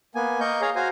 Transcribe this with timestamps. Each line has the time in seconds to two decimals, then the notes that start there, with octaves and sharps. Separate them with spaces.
0.15 A#3 B3 G#5
0.40 A#3 A#4 D#5 C#6 G6
0.61 G#4 C#5 F5 A#5
0.76 F#4 C5 F5 G#5 A#5